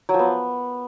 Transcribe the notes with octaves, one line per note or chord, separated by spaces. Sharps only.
F#3
F3
B3